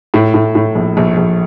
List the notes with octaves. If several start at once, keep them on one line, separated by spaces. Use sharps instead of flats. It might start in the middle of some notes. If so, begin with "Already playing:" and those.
A2
A2
A2
A#1
A#1
A#1